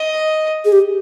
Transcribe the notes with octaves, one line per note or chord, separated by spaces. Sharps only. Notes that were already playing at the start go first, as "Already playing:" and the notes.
Already playing: D#5
G#4
G4